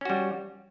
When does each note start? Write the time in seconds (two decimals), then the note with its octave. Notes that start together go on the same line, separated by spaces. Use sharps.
0.01 C#4
0.05 F#4
0.10 G3